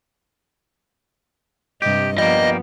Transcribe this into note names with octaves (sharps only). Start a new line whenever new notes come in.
G2 C3 G4 D#5
F3 G3 A#3 B3 D#5